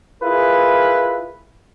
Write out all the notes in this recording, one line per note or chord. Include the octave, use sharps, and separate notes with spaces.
E4 F4 G#4 A#4 B4